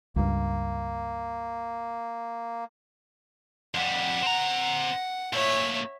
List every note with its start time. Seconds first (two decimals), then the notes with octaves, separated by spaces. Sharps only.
0.16 C#2 G2 A#3
3.75 F2 G3 F#5
4.22 C4 A#5
5.33 A#2 A3 C#5 E5